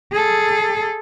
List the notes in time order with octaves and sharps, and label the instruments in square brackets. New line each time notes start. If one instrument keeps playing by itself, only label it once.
[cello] G#4 A4